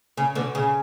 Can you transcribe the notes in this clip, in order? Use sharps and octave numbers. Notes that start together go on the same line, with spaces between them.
C#3
B2 D3
C#3